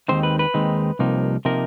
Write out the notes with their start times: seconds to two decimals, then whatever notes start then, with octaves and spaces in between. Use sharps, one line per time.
0.08 D#2 D#3 G#3 C4 D#4 C5
0.23 B4
0.39 B4
0.54 D#2 D#3 G#3 C4 D#4
0.99 C2 C3 F3 A#3 D#4
1.45 C3 F3 A#3 D#4 A#4